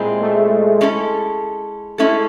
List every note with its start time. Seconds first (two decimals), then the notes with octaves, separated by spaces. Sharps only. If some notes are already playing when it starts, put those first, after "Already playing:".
Already playing: A#2 G3 G#3 C4 E4 G#4
0.21 A3
0.81 G#3 C#4 E4 A4
1.98 G#3 A3 C#4 E4 A4